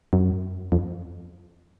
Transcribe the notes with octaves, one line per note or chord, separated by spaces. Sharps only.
F#2
F2